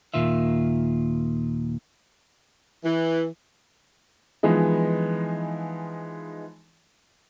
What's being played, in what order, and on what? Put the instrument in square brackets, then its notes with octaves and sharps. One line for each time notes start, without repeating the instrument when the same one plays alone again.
[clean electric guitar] D#2 A#2 D#3 F4 E5
[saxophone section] E3
[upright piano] E3 F3 G#3 B3 D#4